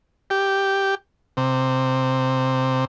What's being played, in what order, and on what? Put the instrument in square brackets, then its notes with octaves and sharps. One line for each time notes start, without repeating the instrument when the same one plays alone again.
[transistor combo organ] G4
C3